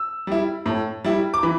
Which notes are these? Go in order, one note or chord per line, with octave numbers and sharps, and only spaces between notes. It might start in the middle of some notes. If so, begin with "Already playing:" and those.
Already playing: E6
G3 E4
A2
G3 E4
D6
E3 B5